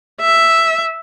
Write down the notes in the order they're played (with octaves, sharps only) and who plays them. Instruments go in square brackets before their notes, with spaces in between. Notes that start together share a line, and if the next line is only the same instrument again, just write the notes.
[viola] E5